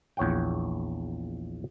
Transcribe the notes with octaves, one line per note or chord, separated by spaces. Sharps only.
A#1 E2 C#5 F#5 G5